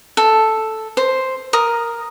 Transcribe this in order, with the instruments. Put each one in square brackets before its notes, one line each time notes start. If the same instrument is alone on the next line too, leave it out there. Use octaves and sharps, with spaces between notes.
[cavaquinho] A4
C5
A#4 D#6